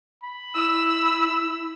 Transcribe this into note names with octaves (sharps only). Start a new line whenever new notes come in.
B5
E4 E6